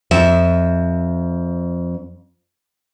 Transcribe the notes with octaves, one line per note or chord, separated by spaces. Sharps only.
F2 E5